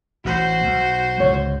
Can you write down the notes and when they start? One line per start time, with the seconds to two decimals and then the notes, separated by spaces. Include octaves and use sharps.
0.25 A1 F#4 C5
0.63 B1
1.20 C#2 G#2 D3 C#5